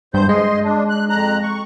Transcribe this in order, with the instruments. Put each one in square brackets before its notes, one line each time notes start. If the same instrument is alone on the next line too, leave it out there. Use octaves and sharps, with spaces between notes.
[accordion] E2 C5 G6 [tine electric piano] G2
[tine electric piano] G#3 [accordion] D#5 C6
[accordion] D4
F#6
F2 A#5 F#6
C#6